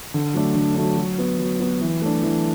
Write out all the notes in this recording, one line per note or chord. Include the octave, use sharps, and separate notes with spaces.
D3
F#3 A3 D4
D3
F#3 A3 D4
F#3
B3 F#4
F#3
B3 F#4
E3
A3 D4
E3